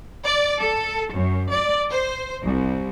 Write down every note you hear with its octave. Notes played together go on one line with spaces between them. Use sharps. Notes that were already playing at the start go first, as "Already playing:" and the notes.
D5
A4
F#2
D5
C5
C2